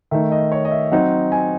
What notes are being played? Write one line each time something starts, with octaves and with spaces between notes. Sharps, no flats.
D#3 A3 D#4 E5
D#5
C#5
D#5
E5
F#3 C4 D#4 F#5
G#5